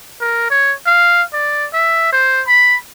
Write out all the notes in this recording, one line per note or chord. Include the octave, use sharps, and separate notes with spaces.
A#4
C#5
F5
D5
E5
C5
B5